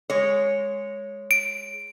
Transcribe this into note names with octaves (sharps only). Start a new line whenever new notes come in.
G#3 C#5
D7